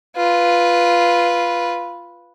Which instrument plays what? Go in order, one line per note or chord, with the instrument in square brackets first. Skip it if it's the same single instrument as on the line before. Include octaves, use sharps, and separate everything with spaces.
[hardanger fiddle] F4 B4